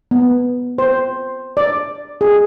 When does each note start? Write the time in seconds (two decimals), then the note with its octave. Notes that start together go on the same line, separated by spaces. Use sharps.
0.11 B3
0.78 C5
1.57 D5
2.21 G#4